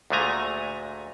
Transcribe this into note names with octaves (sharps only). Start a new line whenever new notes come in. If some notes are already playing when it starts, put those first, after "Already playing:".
D2 A#2 G#3 A3 G#5 A#5